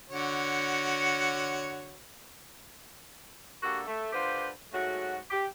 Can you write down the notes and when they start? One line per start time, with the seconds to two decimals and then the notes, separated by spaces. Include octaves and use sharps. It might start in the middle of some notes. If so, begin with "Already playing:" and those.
0.10 D3 F#4 C#5
3.63 D3 A#3 F#4 G4 A4
3.87 A3
4.12 D3 F4 G4 B4 C5
4.73 G#2 F#3 A3 F#4
5.31 G4